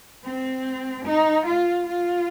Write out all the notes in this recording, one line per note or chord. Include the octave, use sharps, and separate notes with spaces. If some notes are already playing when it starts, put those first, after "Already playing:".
C4
D#4
F4
F4